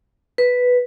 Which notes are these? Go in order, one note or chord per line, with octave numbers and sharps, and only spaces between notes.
B4